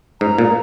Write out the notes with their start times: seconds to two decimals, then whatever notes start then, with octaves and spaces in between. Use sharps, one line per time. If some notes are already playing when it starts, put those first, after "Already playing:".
0.21 G#2 A#5
0.38 A#2